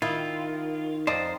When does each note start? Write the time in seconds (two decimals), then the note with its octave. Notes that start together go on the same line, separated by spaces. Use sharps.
0.02 D#3 E4 F4
1.07 F2 C5 D5 D#5 A#5